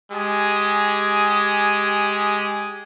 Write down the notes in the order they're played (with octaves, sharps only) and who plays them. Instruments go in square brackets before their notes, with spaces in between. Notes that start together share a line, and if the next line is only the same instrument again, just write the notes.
[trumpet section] G#3 G4 G#5 D#6